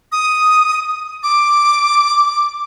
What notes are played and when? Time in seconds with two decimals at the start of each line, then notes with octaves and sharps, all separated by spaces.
0.12 D#6
1.23 D6